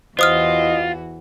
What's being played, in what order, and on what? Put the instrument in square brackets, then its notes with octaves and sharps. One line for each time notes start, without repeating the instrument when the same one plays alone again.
[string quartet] E2 E3 F#4 [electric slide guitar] F4 [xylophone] C5 D#6 F6 [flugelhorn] D#5